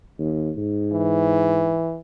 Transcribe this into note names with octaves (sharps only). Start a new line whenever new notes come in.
D#2
G#2
E3